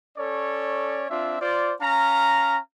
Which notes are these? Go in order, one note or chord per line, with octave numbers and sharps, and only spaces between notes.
C#4 A4 C#5 D5
C4 D4 F4 E5
F4 C5 D5
C#4 F5 A#5